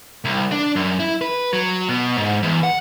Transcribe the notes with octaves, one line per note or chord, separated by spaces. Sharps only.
C2
D4
F#2
E4
B4
F#3
B2
G#2
E2
F#5